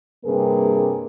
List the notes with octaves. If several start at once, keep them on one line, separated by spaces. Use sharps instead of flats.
G2 C3 A#3 G#4 A#4 B4